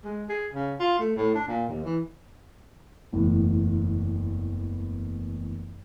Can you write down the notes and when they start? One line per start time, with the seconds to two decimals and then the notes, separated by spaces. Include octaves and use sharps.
0.04 G#3
0.29 G#4
0.54 C#3
0.79 F4
0.99 A3
1.16 A2
1.35 D4
1.47 A#2
1.69 D#2
1.84 E3
3.13 F#1 E2 A2